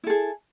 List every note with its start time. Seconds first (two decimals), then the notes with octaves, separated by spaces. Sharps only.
0.04 E4
0.07 A4
0.10 G#4